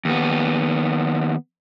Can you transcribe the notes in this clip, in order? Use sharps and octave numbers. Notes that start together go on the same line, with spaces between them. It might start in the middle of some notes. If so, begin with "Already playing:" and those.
D#2 B3